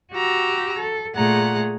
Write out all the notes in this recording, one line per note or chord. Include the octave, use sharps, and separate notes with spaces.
F#4 G4 A#5 E6
A4
A#2 A3 G#4 F#5 A#5